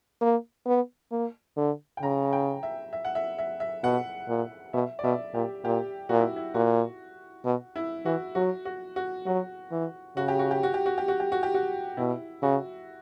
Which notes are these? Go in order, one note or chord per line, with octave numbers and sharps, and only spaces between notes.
A#3
B3
A#3
D3
G5
C#3 A#5
G5
E5
E5
F#5
E5
E5
E5
B2 F#5
A#2
B2 E5
D5
B2 E5
A#2 G4
A#2 G4
A#2 F#4
E4
E4
A#2 F#4
B2
E4
E3 F#4
F#3 F#4
F#4
F#4
F#3 F#4
E3
C#3 F#4
G4
F#4
G4
F#4
G4
F#4
G4
F#4
G4
F#4
G4
F#4
B2 E4
C#3 F#4